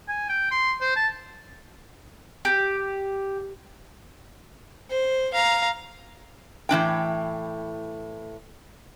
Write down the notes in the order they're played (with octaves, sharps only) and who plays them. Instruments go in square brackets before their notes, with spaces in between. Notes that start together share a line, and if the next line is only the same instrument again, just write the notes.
[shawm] G#5
G5
C6
C5
A5
[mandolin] G4
[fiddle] C5
F5 A#5
[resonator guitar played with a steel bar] A2 E3 D4 G5